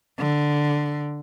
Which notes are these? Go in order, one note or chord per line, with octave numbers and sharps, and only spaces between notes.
D3